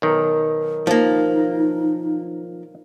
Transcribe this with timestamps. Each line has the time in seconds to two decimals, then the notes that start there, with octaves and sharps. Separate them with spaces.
0.02 B1 D#3 A#4
0.87 F3 A#3 D#4